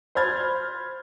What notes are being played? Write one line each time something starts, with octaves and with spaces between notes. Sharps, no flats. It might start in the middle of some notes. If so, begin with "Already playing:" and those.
C5 B5 F6 G#6 A6